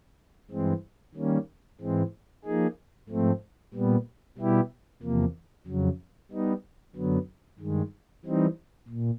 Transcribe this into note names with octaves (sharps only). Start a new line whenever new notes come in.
G2 E3 G#3 C4
D#3 G3 A#3 C#4
G#2 E3 G#3 C4
F3 A#3 D#4 G#4
G#2 F3 A3 C4
A#2 G3 B3
B2 G3 B3 E4 G4
E2 C3 F3 A#3
F2 C#3 F#3
G3 B3 D#4
F#2 D3 F#3 B3
G2 D#3 G#3
E3 G3 C4 D#4
A#2